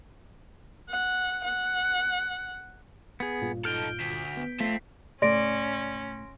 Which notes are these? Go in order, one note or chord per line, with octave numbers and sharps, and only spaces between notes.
F#5
F#5
B3 G#4
G2 A#2 F4
D#4 A4 F6 G6 D7 G7
D2 B6
B3
A3 C4 F4 B6 C7
C#2 A2 A3 C#4 D5 C6 A#6 D7